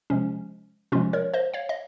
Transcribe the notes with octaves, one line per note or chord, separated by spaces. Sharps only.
C3 F3 G#3 C#4
C3 F3 G#3 C#4 F4
A#4 C#5
C5 D#5
C#5 F5
D#5